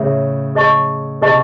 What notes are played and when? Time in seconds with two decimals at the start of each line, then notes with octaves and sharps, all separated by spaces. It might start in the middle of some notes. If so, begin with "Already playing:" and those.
Already playing: A2 C#3 G#4 C#5 E5
0.55 G#4 D#5 A5 C#6
1.21 C3 G#4 D#5 A5 C#6